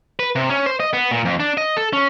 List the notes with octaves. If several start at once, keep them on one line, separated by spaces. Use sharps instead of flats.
B4
C3
C#4
C5
D#5
B3
A#2
F2
D4
D#5
A4
C#4